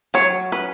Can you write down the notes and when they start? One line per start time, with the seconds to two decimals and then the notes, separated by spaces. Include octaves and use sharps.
0.14 F#3 C#5
0.52 C#4 B4